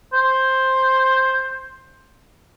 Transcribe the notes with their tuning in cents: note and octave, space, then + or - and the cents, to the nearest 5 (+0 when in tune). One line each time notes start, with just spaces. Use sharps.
C5 +10